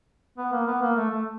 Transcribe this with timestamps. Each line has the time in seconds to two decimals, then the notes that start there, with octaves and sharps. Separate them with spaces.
0.38 B3
0.52 A#3
0.67 B3
0.82 A#3
0.96 A3
1.10 A3